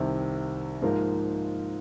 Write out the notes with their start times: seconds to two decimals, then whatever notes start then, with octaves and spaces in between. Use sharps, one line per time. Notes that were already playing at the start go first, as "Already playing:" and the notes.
Already playing: C2 C3 D#3
0.82 G#2 F3 A#3 D#4 A#4